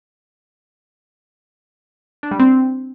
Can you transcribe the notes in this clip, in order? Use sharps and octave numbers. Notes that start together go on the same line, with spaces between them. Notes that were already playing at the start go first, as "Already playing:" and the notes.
D4
G3
C4